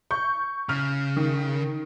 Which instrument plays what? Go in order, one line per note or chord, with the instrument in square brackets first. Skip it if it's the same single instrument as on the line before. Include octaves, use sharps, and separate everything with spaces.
[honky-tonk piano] C#6 G6
[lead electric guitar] C#3 [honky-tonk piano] F6
[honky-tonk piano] D#3